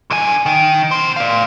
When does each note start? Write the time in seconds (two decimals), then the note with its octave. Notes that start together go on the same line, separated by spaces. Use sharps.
0.11 D3 G#5
0.46 D#3
0.91 B2 C5
1.16 D5 F5